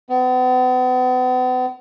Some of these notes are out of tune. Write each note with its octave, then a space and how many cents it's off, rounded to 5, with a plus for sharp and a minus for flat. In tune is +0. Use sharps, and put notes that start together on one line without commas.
B3 +40